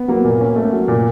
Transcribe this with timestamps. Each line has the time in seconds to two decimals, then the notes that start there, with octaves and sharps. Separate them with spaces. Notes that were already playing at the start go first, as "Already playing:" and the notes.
Already playing: B3
0.08 F#3 A#3
0.25 A#2
0.41 C#4
0.56 A3
0.73 F#3
0.88 A#2